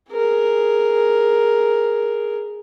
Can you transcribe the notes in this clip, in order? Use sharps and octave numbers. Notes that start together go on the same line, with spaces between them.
G#4 A#4